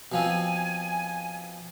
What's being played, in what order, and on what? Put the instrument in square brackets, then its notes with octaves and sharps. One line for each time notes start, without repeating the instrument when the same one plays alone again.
[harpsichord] B2 F3 C4 [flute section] G#5